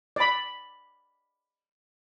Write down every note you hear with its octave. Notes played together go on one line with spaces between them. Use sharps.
D5 B5